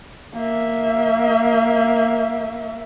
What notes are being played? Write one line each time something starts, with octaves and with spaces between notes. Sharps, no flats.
A#3 E5